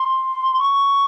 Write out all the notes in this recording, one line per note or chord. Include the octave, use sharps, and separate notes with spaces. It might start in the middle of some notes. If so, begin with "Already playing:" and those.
Already playing: C6
C#6